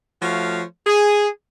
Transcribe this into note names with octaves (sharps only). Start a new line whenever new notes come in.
F3 A3 F#4 C#5 F5
G#4